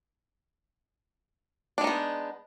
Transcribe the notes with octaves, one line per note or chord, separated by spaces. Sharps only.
G#3 B3 D4 D#4